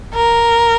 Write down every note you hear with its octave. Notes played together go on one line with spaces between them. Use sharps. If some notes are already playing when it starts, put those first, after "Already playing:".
A#4